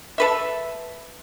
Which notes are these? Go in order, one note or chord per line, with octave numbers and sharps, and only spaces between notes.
A4 B4 E5